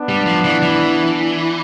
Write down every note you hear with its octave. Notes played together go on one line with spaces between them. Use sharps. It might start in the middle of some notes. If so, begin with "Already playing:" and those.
Already playing: B3 D4
G3
F3
E3
E3